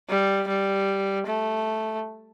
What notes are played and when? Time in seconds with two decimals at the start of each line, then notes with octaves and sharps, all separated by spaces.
0.09 G3
0.48 G3
1.27 A3